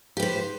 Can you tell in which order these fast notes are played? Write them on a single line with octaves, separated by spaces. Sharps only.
G4 B4 C5